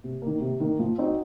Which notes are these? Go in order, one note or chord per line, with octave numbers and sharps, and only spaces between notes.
C3
D#3 A#3
C3
D#3 A#3
F3
C4 D#4 F#4